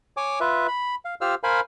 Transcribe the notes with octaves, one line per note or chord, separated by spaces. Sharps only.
C#5 G#5 D6
F4 B4 E5
B5
F5
F4 G4 C5 F5 E6 F6
A#4 C5 F5 G#5 B5